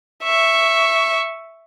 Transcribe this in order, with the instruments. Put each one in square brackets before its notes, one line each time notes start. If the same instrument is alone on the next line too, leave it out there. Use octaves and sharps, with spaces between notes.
[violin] E5 C#6